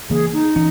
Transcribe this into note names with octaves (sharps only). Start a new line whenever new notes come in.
C#3 E3 A#3 G#4
D#4
E3 C#4